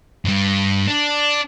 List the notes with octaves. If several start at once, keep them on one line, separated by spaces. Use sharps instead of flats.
G2 G3
D4